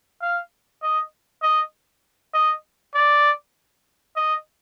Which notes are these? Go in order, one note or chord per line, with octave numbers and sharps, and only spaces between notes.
F5
D#5
D#5
D#5
D5
D#5